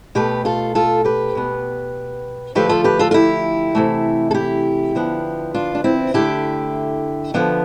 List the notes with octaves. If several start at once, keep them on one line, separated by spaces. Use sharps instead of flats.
B2 A3 G4 B4
F4 A4
F4 A4
G4 B4
B2 B3
D3 F3 A3 G4 B4
F4 A4
G4 B4
F4 A4
F4
E4 G4
C3 E3 A3
A4
E4 G4
D3 F3 B3
D4 F4
D4
C4 E4
D3 A3 E4 G4
D3 F3 B3